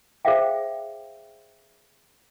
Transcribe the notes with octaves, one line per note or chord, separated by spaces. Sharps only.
G#4 C5 D5 E5 F5 G5